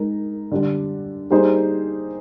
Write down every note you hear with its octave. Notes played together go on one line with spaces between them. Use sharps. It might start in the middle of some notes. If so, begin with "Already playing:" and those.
Already playing: G#3 D#4 A#4
D3 G3 D4
G3 A#3 D#4 G#4 C5